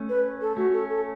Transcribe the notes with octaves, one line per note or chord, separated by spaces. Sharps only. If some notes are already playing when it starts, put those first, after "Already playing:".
Already playing: A3 C#4
B4
A4
A3 C#4 F#4
A4
A4